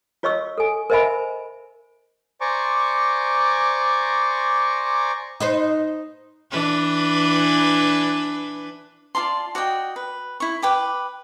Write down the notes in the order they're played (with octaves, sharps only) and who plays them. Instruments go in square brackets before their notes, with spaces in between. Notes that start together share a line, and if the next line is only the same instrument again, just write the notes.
[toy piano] F4 C#5 D#5 C#6 E6
A4 G#5
A#4 C5 D#5 E5 G#5 B5
[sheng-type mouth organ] C5 D5 G#5 A#5 C#6 D6
[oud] D#4 B4 C5
[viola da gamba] E3 D4 B4
[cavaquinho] F4 D5 A5 C6
F#4 D5 D#5 G5
B4
E4 C#6
B4 G5 D6